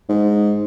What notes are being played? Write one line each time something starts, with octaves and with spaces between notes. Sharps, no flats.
G#2